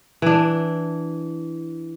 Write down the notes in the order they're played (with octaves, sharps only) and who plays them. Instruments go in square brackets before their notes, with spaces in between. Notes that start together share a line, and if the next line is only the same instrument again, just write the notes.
[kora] E3 D4